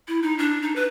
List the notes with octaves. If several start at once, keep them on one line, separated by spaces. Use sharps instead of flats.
E4
D#4
D4
D#4
B4